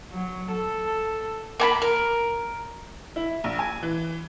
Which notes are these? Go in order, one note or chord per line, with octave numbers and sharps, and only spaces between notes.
F#3
A4
A#3 G#5 B5
A#4
E4
A#1
G#5
E3